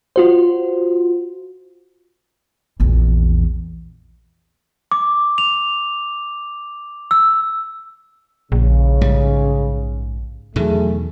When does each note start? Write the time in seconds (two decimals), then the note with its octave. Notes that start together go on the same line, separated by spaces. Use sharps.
0.16 F4 F#4 C5
2.80 A#1 E2
4.92 D6
5.38 F7
7.11 E6
8.52 A#1 C#3
9.01 G#2 G3
10.56 E2 B2 D#3 F#3 A3 G#4